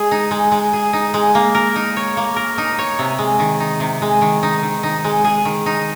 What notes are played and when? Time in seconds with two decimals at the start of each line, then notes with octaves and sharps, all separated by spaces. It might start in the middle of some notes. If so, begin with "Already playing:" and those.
Already playing: G#3 G#4
0.11 D#4
0.31 G#3
0.52 G#3
0.73 G#4
0.93 D#4
1.14 G#3
1.35 A#3
1.55 A#4
1.76 D#4
1.96 C#5
2.17 A#3
2.36 A#4
2.58 D#4
2.79 C#5
2.99 C3
3.18 G#3
3.39 D#3
3.60 D#4
3.80 C3
4.02 G#3
4.21 D#3
4.43 D#4
4.63 D#3
4.83 D#4
5.04 G#3
5.24 G#4
5.45 D#3
5.66 D#4